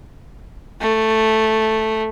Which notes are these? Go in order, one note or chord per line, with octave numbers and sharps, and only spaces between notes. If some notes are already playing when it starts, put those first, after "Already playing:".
A3